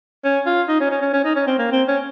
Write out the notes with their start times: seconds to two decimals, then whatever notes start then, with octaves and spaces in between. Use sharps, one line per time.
0.24 C#4
0.46 F4
0.69 D#4
0.80 C#4
0.91 C#4
1.02 C#4
1.13 C#4
1.25 D#4
1.36 C#4
1.47 C4
1.59 A#3
1.72 C4
1.88 C#4